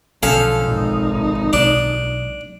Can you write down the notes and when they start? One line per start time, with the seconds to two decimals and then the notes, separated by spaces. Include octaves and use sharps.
0.23 B1 D3 F3 C#4 A4 F5
0.64 G#1 D#4
1.53 B1 D4